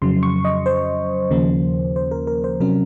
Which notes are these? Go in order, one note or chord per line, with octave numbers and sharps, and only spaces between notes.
F2 C#3 F#3 C6
C#6
D#5
C5
D#2 C#3 F3 A#3
C5
A#4
A#4
C5
C3 F#3 C#4 A#4